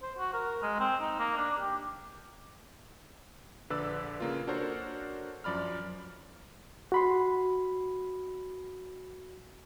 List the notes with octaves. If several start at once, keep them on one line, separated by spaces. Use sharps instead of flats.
C5
F#4
A#4
G#3
C4
D#4
A#3
D4
G4
A#1 D3 B4 D5 E6
C#3 A#3 F4
D4 F#4 A4 A#4 C5 C#5
F#2 F3 D5 B5 F6
F#4 B5 C6